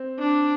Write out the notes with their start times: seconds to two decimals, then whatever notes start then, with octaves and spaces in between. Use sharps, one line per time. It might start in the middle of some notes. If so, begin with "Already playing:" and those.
Already playing: C4
0.19 D4